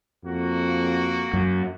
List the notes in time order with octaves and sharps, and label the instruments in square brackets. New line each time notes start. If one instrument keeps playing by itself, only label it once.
[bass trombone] F2 [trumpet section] A#3 F#4
[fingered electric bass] F#2